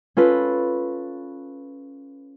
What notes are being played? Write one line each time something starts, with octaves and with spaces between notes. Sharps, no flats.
C#4 F4 A4 B4